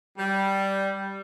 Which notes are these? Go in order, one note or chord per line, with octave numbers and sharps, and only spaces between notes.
G3